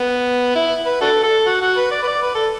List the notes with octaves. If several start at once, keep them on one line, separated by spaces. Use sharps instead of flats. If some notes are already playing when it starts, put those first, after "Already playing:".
Already playing: B3
E4
B4
D4 F#4 A4
A4
F#4
F#4
B4
D5
B4
D5
B4
A4